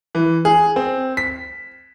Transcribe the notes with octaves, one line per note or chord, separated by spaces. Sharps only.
E3
G#4
C4
B6